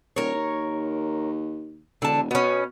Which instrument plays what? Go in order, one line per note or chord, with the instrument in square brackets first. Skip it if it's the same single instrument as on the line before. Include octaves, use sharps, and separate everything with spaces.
[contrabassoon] D#1 [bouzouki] A#4 C#5
[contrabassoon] D#2
[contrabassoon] E1 [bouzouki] D3 A5
[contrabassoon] B2 [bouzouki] B3 C#4